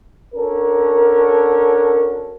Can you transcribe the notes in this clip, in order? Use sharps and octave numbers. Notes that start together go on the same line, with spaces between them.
C#4 D4 F#4 A4 A#4